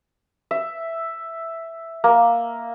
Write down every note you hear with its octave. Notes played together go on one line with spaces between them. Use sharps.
E5
A#3